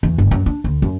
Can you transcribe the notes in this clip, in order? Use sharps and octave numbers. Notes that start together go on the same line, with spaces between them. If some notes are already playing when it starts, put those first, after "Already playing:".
E2
G1
F#2
D4
D2
F#2